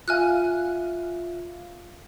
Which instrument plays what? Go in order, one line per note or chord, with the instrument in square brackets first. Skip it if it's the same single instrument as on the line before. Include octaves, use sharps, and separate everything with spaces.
[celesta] F4 E5 F5 [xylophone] G#5 F6 F#6